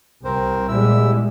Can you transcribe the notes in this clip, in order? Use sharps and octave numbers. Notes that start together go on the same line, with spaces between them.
C2 C4 A#4 C5
E2 A#2 G3 G#3 E4 E6